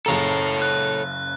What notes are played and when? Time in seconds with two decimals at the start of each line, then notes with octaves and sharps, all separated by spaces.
0.06 F#1 C#3 A4 C#5 A#5
0.62 F#6